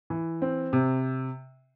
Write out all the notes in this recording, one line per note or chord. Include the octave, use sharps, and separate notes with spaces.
E3
C4
C3